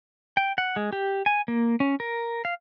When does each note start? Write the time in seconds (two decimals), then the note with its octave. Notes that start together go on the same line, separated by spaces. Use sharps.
0.37 G5
0.58 F#5
0.76 G#3
0.93 G4
1.26 G#5
1.48 A#3
1.80 C#4
2.00 A#4
2.45 F5